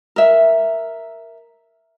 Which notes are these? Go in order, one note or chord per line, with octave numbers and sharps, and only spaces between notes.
A#4 E5